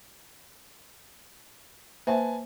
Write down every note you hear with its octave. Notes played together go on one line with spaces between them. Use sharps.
A#3 B4 C5 E5 G#5 A5